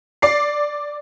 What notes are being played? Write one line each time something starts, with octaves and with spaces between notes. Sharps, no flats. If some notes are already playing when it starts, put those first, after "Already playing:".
D5 C7